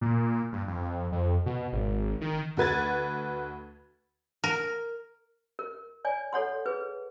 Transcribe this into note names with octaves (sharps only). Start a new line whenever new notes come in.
A#2
G2
F2
F2
B2
G#1
D#3
D2 F#4 B4 G#6 A6
A#4
A#4
C#5 D5 G#5
A4 C#5 F#5 C6
G#4 B4